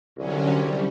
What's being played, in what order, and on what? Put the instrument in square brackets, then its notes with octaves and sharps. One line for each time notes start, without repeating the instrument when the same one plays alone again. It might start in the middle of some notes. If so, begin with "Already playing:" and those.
[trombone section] C2 [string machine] D3 F#3 C#4
[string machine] G3